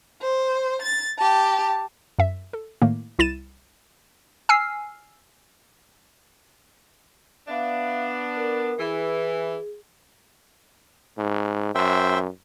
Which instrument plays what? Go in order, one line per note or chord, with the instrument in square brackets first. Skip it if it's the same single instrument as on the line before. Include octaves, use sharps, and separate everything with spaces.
[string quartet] C5
A6
G4 A5
[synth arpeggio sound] F#2 E5
A4
A2 D#3 A3 A#3
C2 E4 A6 D#7 E7
[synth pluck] G#5 E6 F6 C7
[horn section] B3 D4 [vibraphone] E5 F5
[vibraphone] A#4
[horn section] E3 [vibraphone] G#4
[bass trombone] G#2
[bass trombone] F#2 [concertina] C5 E5 G5